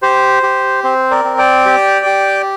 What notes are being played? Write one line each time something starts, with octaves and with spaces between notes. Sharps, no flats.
G4 C5
G4
C4 C5
A#4 D5
C4
D5 G5
G4
G4